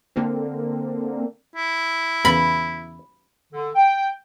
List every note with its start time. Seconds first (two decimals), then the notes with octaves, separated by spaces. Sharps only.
0.16 D3 A#3 C4
1.56 E4
2.25 E2 C#3 E3 B5
3.53 D3
3.75 G5